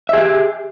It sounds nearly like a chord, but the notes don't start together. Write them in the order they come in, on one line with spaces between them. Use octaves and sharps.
E5 G#4 G4